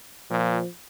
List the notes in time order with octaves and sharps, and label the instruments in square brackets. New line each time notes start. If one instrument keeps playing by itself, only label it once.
[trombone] A#2 [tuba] F3